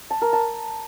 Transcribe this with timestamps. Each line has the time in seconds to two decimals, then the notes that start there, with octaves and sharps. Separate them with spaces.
0.10 A5
0.22 A#4
0.33 A5